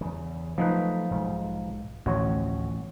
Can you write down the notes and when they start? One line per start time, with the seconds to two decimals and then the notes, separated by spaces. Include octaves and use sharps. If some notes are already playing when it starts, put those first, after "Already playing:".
0.01 E2 C#3
0.58 F3 F#3 A3 D#4 B4
1.11 B1 G#2
2.06 A1 D2 B2 F3 F#4 C#5